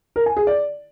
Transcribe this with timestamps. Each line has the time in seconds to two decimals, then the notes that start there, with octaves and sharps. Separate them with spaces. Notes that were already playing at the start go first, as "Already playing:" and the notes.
0.16 A#4
0.26 G#5
0.37 G#4
0.47 D5